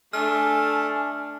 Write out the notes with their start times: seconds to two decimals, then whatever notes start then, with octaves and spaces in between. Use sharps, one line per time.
0.13 A3 D4 G#5 F6